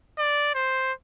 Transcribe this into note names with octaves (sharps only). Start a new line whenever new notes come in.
D5
C5